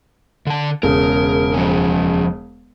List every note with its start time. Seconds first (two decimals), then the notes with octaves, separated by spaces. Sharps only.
0.47 D3 A5
0.83 E1 C#3 A#4
1.54 F3 C#4